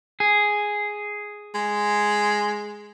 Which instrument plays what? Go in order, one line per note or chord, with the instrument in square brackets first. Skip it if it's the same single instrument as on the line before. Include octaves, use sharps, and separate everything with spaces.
[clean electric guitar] G#4
[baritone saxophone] G#3